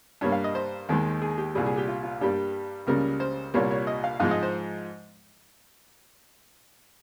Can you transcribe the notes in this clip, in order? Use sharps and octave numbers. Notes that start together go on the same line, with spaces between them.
G2 G3 A#3 C#5
F5
D#5
C5
D#2 D#3 G#3
G#4
G4
C2 A#2 G3 G#4
G#4
G4
F4
F4
G2 G3 A#3 G4
C#2 C#3 G3 A#3 A#4
C5
C2 A#2 G3 A#3 C#5
C#5
D#5
F5
G#2 F3 G#3 F5
D#5
C5